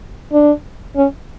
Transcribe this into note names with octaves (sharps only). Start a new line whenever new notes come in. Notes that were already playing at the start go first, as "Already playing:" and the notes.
D4
C#4